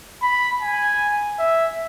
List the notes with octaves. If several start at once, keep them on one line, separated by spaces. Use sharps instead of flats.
B5
G#5
E5